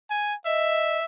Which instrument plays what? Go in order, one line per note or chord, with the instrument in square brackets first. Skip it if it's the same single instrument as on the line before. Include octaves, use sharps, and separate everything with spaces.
[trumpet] G#5
[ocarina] D#5 [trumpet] E5